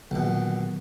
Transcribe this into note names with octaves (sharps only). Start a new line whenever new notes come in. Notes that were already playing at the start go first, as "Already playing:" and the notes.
A#1 B2 D3 D#3 F#3